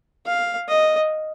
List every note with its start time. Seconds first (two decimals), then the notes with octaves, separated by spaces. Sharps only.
0.27 F5
0.68 D#5